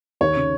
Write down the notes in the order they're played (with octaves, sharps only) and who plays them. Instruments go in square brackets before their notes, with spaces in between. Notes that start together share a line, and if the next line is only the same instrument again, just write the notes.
[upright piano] D#2 [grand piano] C#5
[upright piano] C#3